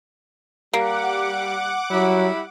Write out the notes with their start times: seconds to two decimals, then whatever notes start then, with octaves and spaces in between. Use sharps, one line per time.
0.73 G3 A#3 F#5 D6
1.90 F#3 G3 E4